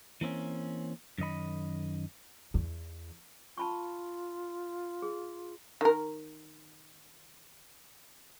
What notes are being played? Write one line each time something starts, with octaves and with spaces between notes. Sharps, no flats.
E3 A#3 C4 C#4
F#2 D#3 D#5 B5
E2 E3
F4 A5 B5 C#6
G#4
D#3 A#4